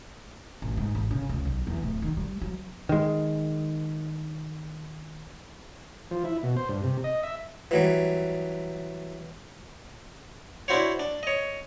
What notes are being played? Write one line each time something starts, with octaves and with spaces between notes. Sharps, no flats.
A1
G#2
A1
C#3
C#2
B1
E2
D1
D#3
G3
F#3
D#3 G#3
F3
E4
B2
C5
G2
C3
D#5
E5
E3 F#3 G3
D4 E4 F#4 C5 C#5
D4
C#5 D#5